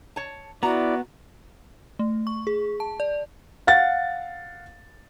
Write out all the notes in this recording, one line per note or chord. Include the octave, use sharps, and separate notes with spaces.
C#5 A5
B3 E4 F#4 D5 A#5
A3
C#6
G#4
A5
D5
F5 F#5 A6